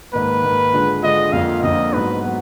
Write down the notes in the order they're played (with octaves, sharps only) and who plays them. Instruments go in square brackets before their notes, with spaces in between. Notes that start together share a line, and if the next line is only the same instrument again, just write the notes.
[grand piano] G#2 D#3 A#3 [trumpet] B4
[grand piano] G#2 D#3 A#3
D3 G#3 D4 F4
[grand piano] D3 G#3 D4 F4 [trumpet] D#5
[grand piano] F2 D3 F3 A#3 [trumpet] F5
[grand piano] F2 D3 F3 A#3 [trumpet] D#5
[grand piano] G#2 F#3 B3 D#4 [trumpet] B4
[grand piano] F#3 B3